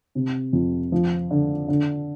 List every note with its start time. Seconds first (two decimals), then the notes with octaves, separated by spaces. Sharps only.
0.15 C3
0.53 F2
0.92 F3
1.31 D3
1.68 D3